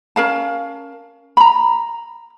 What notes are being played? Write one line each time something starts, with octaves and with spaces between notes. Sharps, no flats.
C#4 A#4 F5 A5
A#5 B5